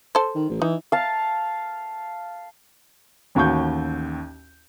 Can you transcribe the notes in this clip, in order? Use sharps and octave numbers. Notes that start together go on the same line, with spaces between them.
A4 C5
D#3
A1
E3 D#4
F5 A5
A1 D#2 F#4 C#6 G6